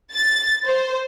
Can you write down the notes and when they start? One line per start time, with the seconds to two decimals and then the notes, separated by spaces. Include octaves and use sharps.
0.14 A6
0.66 C5